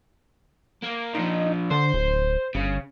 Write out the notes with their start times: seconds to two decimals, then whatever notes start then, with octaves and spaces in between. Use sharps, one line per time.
0.84 A#3
1.15 A#2 F3 D#4
1.71 D3 C5
1.94 D1
2.55 G1 C#3